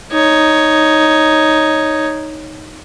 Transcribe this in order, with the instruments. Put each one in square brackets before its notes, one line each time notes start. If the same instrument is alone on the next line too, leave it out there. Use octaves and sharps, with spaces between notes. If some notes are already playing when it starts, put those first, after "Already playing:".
[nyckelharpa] D#4 C#5